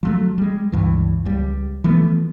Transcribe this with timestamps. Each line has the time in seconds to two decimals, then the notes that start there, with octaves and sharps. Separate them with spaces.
0.03 F3 F#3 A3
0.38 G3 G#3
0.72 C#2 G2 E3
1.25 C#2 G3
1.84 E3 F3 A3 B3